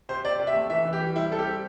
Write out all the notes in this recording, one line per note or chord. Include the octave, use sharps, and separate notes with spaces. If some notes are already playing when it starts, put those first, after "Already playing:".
C3 C5
C3 D5
C3
E5
A3
E3 E5
E3
G4
G3
C3 E4
G3 A4
G4
C4